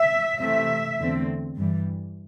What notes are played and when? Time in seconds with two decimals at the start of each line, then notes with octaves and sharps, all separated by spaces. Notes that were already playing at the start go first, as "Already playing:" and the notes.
Already playing: E5
0.39 C3 E3 A3 C4 E5
0.99 E2 D3 A3 C4
1.58 G2 E3 G3